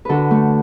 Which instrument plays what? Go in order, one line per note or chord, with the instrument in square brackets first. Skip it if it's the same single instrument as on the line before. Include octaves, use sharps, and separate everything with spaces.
[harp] D3 F#4 A4 B4
A3